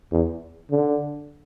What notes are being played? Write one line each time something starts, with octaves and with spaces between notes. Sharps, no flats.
E2
D3